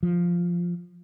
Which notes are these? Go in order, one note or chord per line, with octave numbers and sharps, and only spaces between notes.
F3